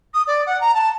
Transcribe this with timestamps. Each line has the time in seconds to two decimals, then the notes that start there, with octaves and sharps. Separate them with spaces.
0.14 D#6
0.27 D5
0.46 F#5
0.60 A#5
0.74 A5